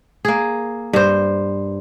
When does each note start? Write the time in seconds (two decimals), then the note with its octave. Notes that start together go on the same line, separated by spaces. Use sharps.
0.25 A#3 G#4
0.93 G2 C5